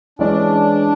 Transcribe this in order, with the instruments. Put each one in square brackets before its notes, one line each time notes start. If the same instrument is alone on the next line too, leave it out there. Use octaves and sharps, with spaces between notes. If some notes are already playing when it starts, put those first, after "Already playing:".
[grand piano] E3 G#3 C#4 G#4 D5 [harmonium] D4